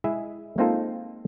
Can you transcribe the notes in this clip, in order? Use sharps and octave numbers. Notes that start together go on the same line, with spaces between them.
G#3 E4 G#4 D#5 E5
G#3 A#3 C4 D#4 F4 A4